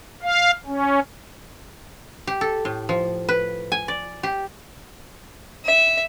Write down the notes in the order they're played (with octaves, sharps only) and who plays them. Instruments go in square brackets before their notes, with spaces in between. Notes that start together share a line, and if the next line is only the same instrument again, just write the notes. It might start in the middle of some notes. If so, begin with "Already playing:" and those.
[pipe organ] F5
C#4
[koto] G4
A4
A2
F3
B4
G#5
D5
G4
[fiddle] E5